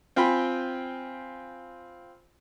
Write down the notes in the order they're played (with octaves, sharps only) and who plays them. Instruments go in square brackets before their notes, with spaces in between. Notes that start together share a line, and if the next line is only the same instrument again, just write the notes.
[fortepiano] C4 F4 G5 G#5 B5